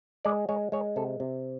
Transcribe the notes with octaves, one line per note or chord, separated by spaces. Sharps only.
G#3 D5
G#3 C#5
G#3 C#5
C3 A4
C3